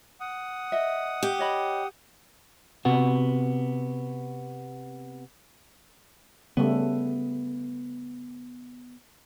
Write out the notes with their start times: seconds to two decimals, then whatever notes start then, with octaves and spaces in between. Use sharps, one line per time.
0.21 F#5 D#6
0.72 D#5 E5
1.23 G4
1.39 C#5 D#5 B5
2.85 C3 B3 F#4
6.57 C#3 G3 A3 B3